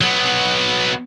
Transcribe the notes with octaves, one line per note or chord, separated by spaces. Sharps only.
F#3 B3